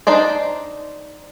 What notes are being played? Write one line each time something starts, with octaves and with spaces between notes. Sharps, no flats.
D4 D#4 C5 D5